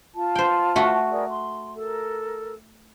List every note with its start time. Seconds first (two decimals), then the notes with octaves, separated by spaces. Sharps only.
0.14 F4 A5
0.35 C5 G5
0.76 A3 F#4
1.10 G#4 A#4 D5
1.29 C6
1.75 A4 A#4